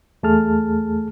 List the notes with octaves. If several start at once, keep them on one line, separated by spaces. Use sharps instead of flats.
E2 A3 G#4 A5 F6